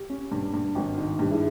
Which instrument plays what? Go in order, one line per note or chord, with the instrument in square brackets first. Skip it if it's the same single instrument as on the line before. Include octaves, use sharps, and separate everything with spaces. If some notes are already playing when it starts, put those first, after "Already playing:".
Already playing: [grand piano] G4
[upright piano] C#4
G2
G2
G#1
D#3
[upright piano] G2 [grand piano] G4
[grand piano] E4 G#4